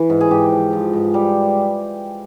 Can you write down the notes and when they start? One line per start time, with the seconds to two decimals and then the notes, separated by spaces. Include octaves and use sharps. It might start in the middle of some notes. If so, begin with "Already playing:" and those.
Already playing: E3
0.10 G#2
0.21 G#4
0.31 G#2 G4
0.52 F3
0.73 F3
0.93 G#2
1.14 G3